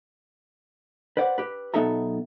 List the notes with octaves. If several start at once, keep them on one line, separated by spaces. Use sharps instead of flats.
B4 C5 D5 F#5
G4 B4
B1 B3 D#4 A4 E5 A#5